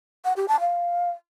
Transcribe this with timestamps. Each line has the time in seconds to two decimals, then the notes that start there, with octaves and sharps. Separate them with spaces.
0.25 F#5
0.36 G4
0.48 A5
0.60 F5